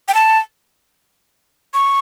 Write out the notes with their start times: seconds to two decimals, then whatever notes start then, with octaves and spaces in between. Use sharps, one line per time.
0.08 G5
0.14 A5
1.74 C#6